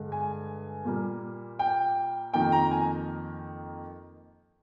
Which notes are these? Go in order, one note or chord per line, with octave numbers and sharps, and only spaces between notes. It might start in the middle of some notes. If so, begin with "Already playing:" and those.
Already playing: G2 D3 G#3
G#5
A#2 G3 A#3
G5
F2 D#3 A#3 G5
A#5
G#5